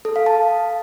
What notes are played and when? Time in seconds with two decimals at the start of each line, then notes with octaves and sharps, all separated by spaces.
0.05 A4
0.16 F5
0.26 A5